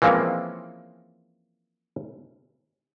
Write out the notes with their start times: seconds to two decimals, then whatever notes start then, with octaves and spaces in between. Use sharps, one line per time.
0.02 E3 F3 G#3 A#3 C4 C#4